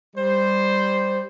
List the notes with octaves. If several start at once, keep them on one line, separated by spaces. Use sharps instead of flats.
G3 C5